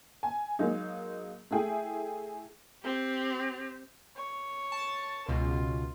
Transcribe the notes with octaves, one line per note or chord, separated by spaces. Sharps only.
G#5
F#3 G#3 A#3 D#4
A3 E4 G#4 G5
C4 G4
C#5
A5
C#2 B2 F4